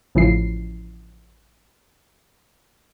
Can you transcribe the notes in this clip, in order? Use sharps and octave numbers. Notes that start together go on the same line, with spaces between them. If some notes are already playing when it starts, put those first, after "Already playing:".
A1 C#3 F3 E4 C7